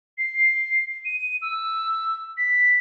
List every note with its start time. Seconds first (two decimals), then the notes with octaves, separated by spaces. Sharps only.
0.17 C7
1.05 D#7
1.41 E6
2.37 B6